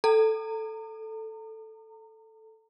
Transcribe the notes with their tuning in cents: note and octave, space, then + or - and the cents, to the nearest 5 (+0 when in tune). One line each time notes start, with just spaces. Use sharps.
A4 +0 A#5 -35